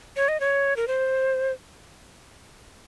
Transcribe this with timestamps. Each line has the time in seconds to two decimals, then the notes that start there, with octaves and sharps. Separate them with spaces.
0.16 C#5
0.28 D#5
0.40 C#5
0.77 A#4
0.88 C5